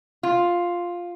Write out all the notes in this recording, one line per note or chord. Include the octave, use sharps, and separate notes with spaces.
F4